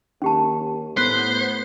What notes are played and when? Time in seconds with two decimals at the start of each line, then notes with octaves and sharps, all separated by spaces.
0.22 D#2 C#4 G4 A5
0.97 A2 B3 C5